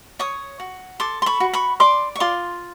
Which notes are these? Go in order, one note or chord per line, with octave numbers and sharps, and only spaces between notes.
C#5 C#6 D#6
F#4
A4 C6 D6
C6
B5 C#6
F#4
B5 C#6
D5 C6 D6
C#6
F4 C6 D6